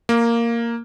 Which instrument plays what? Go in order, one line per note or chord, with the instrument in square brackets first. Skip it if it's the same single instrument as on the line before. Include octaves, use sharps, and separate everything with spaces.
[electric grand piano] A#3